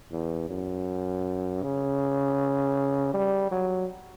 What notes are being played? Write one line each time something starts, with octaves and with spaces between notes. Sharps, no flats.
E2
F#2
C#3
G3
F#3